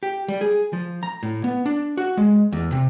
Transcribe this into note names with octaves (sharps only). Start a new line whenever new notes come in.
G4
G3
G#4
F3
A#5
A2
B3
D4
F#4
G#3
E2
C3